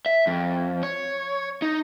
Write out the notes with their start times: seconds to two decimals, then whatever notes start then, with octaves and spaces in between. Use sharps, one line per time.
0.06 E5
0.27 F2
0.83 C#5
1.62 D#4